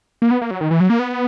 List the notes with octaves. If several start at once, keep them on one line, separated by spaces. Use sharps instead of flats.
A#3
B3
A#3
F#3
D#3
E3
F#3
A#3
B3